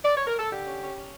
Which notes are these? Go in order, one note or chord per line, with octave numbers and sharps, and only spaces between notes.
D5
C#5
A#4
A4
D3 G4
C#4
C#4
C#4